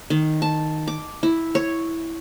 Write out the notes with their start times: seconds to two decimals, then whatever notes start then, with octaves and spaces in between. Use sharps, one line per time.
0.10 D#3
0.42 A5
0.88 D6
1.23 E4
1.55 C#5